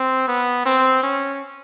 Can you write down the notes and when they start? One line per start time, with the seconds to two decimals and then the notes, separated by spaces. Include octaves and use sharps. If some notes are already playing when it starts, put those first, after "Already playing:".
Already playing: C4
0.28 B3
0.66 C4
1.03 C#4